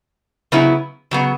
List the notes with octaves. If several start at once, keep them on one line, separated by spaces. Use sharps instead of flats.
C#3 F#3 B3 E4
C#3 F#3 B3